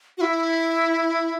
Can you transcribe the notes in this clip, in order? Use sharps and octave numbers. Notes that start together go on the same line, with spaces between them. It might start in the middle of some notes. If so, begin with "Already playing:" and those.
F#4
E4